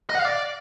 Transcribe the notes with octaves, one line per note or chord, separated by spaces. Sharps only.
D#5
F#5
F5
D5